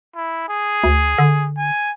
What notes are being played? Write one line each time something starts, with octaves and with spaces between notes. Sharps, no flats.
E4
G#4
D2
D3
G#5